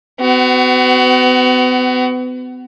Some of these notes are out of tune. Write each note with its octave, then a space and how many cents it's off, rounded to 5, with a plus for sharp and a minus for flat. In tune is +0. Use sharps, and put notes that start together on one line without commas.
B3 +40 F#4 +20